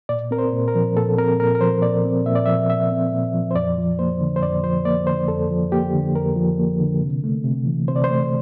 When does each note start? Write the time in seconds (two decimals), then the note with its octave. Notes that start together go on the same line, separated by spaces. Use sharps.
0.09 A#2 D5
0.31 C4 A#4
0.38 C5
0.53 A#2
0.68 A#4
0.75 F3
0.96 A#2 A4
1.18 C4 A#4
1.39 A#2 A#4
1.55 A#4
1.61 F3 C5
1.82 A#2 D5
2.05 C4
2.26 A#2 E5
2.35 D5
2.46 F3 E5
2.69 A#2 E5
2.91 C4
3.13 A#2
3.34 F3
3.51 C5
3.55 F2 D5
3.78 F3
3.99 A#3 C5
4.21 D3
4.36 C5
4.42 F2 D5
4.64 F3 C5
4.85 A#3 D5
5.07 D3 C5
5.28 F2 A4
5.51 F3
5.72 A#3 G4
5.93 D3
6.15 F2 A#4
6.36 F3
6.59 A#3
6.80 D3
7.01 C3
7.24 A3
7.44 C3
7.66 E3
7.88 C3 C5
7.96 D5
8.04 C5
8.10 A3